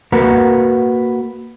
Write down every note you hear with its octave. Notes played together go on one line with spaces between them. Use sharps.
A#3 F#4 A#4 B4 F#5 A#5